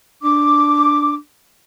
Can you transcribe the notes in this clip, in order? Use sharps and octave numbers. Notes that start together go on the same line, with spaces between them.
D4 D6